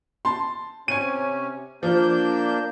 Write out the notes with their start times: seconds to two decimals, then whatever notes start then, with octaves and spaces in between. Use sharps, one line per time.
0.25 A5 C6
0.88 C3 C#4 G#5 D#7
1.83 F3 A#3 D4 G6